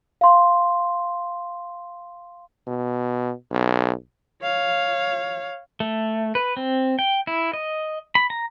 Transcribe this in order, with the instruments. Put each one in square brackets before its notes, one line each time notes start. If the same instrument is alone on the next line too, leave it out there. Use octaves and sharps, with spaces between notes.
[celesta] F5 C6
[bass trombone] B2
B1
[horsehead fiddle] C#5 F5
[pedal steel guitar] A3
B4
C4
G5
E4
D#5
B5
A#5